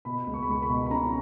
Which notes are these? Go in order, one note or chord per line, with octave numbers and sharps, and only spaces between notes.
B2 B5
C#2
C#6
B5
C#2 C#6
B5
B2
B5
C#4 A#5